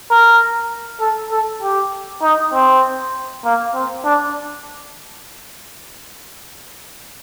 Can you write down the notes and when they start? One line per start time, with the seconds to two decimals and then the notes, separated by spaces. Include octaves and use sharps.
0.11 A#4
1.01 A4
1.32 A4
1.62 G4
2.23 D#4
2.53 C4
3.45 A#3
3.75 C4
4.05 D4